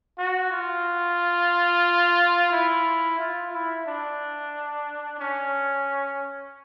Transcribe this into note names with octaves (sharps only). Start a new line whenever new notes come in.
F#4
F4
E4
F4
E4
D4
C#4